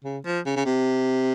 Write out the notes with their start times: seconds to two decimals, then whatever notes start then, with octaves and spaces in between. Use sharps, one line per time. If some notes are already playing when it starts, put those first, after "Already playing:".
0.04 C#3
0.25 F3
0.46 C#3
0.56 C#3
0.65 C3